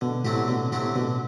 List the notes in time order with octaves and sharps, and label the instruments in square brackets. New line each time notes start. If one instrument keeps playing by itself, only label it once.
[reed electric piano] B2 [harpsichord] D3
[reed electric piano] A2 [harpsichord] F#3 A3 C4 G4
[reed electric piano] B2 [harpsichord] D3
[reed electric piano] A2 [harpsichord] F#3 A3 C4 G4
[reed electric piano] B2 [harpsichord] D3